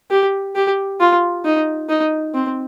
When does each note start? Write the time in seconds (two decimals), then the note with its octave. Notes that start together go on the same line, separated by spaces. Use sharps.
0.11 G4
0.55 G4
1.00 F4
1.45 D#4
1.89 D#4
2.34 C4